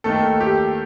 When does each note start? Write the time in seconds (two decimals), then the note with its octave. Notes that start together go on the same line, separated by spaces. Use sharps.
0.04 D#2 D#3 A3 A4
0.41 G4